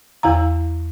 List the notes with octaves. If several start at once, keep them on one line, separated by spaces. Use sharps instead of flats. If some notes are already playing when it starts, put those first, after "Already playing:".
E2 E4 F5 A#5